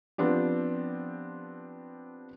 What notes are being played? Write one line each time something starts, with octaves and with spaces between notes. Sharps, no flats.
F3 B3 C4 D4 G4